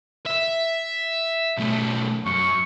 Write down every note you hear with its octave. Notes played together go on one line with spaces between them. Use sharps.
E5
B1 A3
F#2 C#6